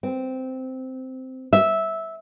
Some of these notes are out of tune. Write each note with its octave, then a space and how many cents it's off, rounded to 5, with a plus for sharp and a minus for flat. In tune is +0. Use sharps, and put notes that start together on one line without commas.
C4 -10
E5 -10